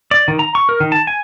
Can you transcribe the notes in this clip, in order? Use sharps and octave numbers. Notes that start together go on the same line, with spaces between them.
D5
D#3
A#5
C#6
A#4
D#3
A5
G#5